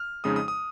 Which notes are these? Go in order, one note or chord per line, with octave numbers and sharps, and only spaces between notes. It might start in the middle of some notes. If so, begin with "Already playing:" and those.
Already playing: F6
F2 C#3 G#3 D#4 D#6
D#6
D#6